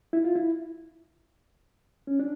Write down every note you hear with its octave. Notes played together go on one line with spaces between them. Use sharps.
E4
F4
E4
C#4
D4